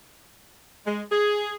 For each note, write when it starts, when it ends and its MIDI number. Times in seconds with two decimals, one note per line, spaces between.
0.86 1.02 56
1.11 1.55 68